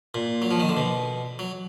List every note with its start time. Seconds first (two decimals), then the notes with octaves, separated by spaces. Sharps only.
0.14 A#2
0.42 F#3
0.51 F3
0.60 D#3
0.69 D3
0.77 B2
1.39 F#3